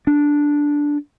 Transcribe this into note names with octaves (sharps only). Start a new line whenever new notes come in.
D4